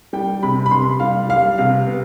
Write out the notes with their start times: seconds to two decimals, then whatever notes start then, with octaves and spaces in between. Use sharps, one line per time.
0.13 G3 G5
0.43 C3 B5
0.66 B5
0.71 C3 C6
1.00 G3 F5
1.29 G3 F5
1.58 C3 F5
1.87 B3